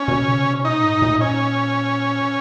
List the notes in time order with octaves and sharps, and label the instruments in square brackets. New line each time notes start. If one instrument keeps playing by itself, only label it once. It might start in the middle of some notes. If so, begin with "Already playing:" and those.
Already playing: [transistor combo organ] C#4
[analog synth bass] B2
C#3
B2
[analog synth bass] A#2 [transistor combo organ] D#4
[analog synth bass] G#2
A#2
[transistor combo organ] C#4